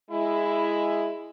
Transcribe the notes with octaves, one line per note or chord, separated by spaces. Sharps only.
G#3 E4